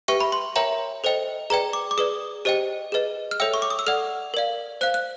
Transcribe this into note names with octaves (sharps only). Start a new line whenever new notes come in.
G4 B4 E5 G5 C#6
B5
C6
A#4 C#5 E5 G5 A#5
A4 C5 D#5 G5
G#4 B4 D5 G5 A#5
D6
D6
G#4 B4 D5 D#6
G4 C5 D#5 G5
G#4 B4 D#5
F6
A4 C#5 E5 G5 E6
C#6
D6
D#6
E6
A4 D5 F#5 F6
A#4 D5 F5
C5 F5 F#6
F#6